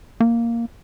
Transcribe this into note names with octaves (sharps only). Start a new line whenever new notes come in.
A#3